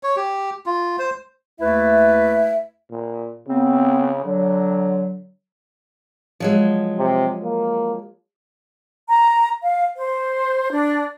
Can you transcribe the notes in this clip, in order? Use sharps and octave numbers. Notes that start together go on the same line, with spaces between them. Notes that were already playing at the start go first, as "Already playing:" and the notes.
C#5
G4
F4
C5
D#2 A3 E4 B4 E5
A#2
C#3 B3 C4
D3 F#3
F3 F#3 G#3
C3
A#3
A#5
F5
C5
D4